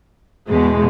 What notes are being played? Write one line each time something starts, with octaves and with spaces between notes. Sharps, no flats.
E2 B2 G#3